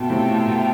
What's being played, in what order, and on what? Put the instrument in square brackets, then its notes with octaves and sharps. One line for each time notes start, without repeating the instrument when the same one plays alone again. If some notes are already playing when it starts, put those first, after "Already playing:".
Already playing: [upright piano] B2 [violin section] F4 A4 E5 G5
[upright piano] A2 C3
A2
B2